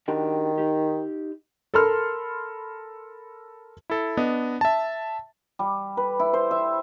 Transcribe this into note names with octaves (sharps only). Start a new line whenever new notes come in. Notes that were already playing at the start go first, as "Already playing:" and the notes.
D#3 D4 F#4 G4
D#4 G4
A4 A#4 B5 C6 F6
E4 A4
B3 D4 D#5
E5 A5
G3
B4
E4
C5
E5